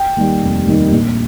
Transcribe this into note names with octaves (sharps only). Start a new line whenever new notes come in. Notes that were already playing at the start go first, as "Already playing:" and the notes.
Already playing: G5
D#2 D#3 G3
F1
D#2 D#3 G3
A#1